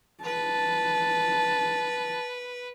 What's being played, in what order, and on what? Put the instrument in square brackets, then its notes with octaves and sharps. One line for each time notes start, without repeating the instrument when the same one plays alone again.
[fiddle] B4 [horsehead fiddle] A5